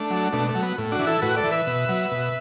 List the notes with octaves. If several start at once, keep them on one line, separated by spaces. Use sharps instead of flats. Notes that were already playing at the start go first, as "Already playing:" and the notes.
Already playing: A3 D4
F#3
B2 A3 D4
A3
F#3
B3
A2
D4 F#4
E3
E4 A4
A2 F#4 B4
A4 D5
E3
B4 E5
B2
F#3
B2